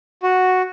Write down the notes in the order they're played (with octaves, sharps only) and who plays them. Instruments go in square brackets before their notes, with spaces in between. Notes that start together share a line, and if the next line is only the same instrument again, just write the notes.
[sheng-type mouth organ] F#4